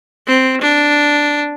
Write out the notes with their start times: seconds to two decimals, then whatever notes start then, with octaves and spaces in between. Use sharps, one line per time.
0.27 C4
0.61 D4